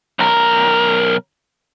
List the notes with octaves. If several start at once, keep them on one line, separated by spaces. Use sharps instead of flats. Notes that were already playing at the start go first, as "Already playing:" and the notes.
B1 A#4